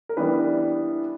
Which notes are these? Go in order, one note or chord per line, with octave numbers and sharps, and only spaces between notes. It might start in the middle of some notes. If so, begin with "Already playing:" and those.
A#4
E3 G3 B3 D4 B4